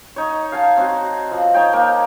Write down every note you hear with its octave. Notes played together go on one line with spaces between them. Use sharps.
D#4 C#5
F5 G#5 A5
C4 F#4
F3
D#4 C#5 G5
A#3